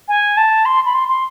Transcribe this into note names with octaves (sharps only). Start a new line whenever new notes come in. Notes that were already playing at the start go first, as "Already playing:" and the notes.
G#5
A5
C6
B5
C6
C6